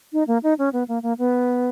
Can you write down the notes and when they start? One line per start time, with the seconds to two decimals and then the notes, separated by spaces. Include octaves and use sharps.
0.13 D#4
0.28 A#3
0.43 D#4
0.59 C#4
0.73 B3
0.88 A#3
1.03 A#3
1.18 B3